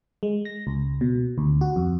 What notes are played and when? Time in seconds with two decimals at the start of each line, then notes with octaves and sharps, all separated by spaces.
0.23 G#3
0.45 A#6
0.67 C#2
1.01 B2
1.38 D2
1.61 F#4
1.76 F2